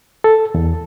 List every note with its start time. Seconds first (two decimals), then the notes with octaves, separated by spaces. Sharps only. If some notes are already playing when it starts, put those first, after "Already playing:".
0.24 A4
0.55 E2